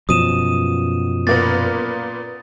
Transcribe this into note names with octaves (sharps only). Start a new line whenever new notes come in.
F#2 B2 F3 D#6 D#7 E7
A#2 A#3 B3 A6